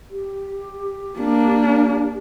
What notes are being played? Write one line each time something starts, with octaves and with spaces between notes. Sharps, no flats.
G4
A#3 D4